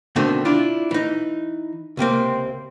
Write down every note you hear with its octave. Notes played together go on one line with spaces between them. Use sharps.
B2 D3 D#3 A3 C4
D4 E4 F4
E3 D#4
C#2 C3 A#3 C4